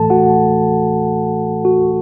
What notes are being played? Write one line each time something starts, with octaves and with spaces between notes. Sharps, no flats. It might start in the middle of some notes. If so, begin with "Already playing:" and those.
Already playing: A2 E3 A3 A4 A5
F#4 F#5
F#4